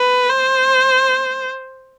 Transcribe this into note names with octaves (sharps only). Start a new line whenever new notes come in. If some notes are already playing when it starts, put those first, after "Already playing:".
Already playing: B4
C5